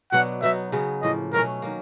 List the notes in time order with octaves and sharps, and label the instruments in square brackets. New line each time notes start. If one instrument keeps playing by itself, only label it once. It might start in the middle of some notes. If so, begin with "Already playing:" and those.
[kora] B2 F#3 B3 D4 [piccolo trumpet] F#5
[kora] F#3 B3 D#4 [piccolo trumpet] E5
[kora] C#3 F#3 B3
[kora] A2 F3 A#3 [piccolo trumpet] D#5
[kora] B2 F#3 A3 C#4 [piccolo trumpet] A#4
[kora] D#3 F#3 A#3